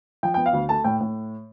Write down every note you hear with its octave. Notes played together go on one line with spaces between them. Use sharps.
F3 G5
B3 G5
F5
D2
A3 A5
A2 G5
A2